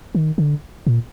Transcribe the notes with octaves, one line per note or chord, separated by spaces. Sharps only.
D#3
D3
A#2